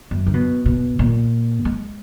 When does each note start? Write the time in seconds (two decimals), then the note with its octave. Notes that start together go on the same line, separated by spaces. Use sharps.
0.11 F#2
0.26 D3
0.34 B2
0.66 B2
0.99 A#2
1.65 G#3